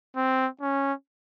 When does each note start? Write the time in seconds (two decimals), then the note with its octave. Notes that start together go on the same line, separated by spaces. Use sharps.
0.16 C4
0.61 C#4